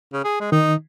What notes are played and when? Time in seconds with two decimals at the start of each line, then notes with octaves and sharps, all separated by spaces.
0.13 C#3
0.24 G#4
0.40 G#3
0.52 D#3 D#4